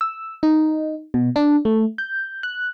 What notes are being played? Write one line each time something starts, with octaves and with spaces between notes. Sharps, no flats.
E6
D#4
B2
D4
A3
G6
F#6